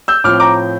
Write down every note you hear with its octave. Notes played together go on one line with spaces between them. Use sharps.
E6 G6
A2 F3 C4 D6 F6
A#5 D6